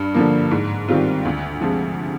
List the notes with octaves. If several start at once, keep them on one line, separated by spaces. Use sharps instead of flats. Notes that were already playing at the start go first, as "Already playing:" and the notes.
Already playing: G2
D3 F3 A#3
G#2
D#3 G3 C4 F4
D2
C3 F3 G#3